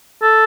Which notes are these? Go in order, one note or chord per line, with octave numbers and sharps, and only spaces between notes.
A4